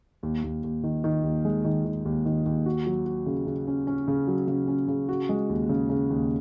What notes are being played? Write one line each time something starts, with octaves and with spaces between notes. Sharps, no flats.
D#2
D#2
D#2
D#3
D#3
D#2
G#3
D#3
D#3
D#2
D#3
D#2
F#4
F#3
F#4
C#3
C#3
C#4
C#4
C#3
F#3
C#3
C#4
C#3
F#4
G#3
D#2
C#3
C#3
D#2